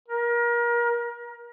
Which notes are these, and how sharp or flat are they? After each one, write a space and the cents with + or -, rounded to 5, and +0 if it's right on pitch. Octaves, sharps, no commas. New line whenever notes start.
A#4 +30